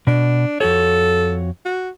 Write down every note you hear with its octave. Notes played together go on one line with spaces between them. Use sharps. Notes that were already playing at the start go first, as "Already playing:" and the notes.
B2 D4
F2 F#4 A4 C#5
F#4